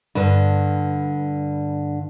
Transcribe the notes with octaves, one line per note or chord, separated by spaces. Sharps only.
G2 D3